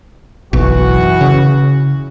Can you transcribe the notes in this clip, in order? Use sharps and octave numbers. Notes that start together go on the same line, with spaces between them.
F#1 B1 E3 F#4
C#3